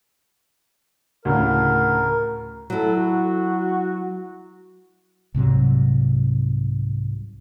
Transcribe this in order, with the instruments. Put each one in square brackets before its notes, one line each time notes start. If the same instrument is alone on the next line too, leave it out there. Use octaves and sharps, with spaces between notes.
[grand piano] D2 A2 C#3 [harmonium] A#4
[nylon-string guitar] F#3 E4 [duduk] A4
[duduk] F#4
[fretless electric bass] C2 G#2 C3 F#3